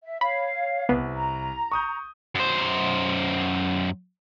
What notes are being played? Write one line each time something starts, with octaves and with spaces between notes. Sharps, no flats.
E5
C#5 F5 B5
C2 B3
A#5
C#6 D#6 G6
F#2 C5